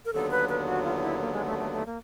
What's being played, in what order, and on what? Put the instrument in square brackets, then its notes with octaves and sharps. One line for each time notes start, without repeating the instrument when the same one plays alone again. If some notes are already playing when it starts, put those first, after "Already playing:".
[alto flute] A#4
[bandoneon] D#2 D3 F#3 B3 [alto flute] A4
[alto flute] B4
B4
F#4
F4
F4
E4
A#3
G#3
A3
A3
A3
A#3